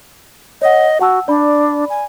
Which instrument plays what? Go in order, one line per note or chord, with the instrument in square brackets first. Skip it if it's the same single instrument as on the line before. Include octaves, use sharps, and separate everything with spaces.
[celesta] C#5 F#5 [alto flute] D#5
[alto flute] F#4 [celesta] F#5 A5 E6
[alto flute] D4 [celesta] D5 B5
[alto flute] G#5